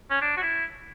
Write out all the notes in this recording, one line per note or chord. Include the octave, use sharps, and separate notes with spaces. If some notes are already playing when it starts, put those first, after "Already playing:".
C#4
D4
F#4
E4